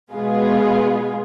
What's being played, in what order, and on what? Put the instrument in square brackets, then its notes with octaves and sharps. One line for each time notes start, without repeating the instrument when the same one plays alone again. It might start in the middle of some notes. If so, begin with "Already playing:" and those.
[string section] B2 G#3 B3 F4 G#4